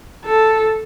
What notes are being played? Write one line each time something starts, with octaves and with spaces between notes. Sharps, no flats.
A4